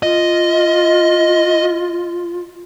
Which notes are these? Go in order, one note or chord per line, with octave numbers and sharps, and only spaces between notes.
F4 D#5